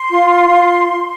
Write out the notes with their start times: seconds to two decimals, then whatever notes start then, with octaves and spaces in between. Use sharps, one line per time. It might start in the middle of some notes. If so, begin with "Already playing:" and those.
Already playing: C6
0.09 F4
0.48 F4